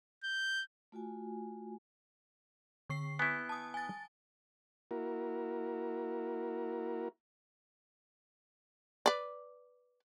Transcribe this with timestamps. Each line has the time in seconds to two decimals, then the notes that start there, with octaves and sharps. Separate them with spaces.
0.24 G6
0.92 A3 F4 F#4 G#5
2.90 D3 C#6 C7
3.19 B3 E4 G#5
3.49 A5 D#6
3.74 G#5 A6
4.91 A#3 E4 F#4 A#4
9.06 B4 D5